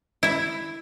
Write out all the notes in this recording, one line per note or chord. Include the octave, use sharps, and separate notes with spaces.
E4 E5